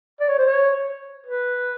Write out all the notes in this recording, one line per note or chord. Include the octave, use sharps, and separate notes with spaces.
D5
C#5
C5
C#5
B4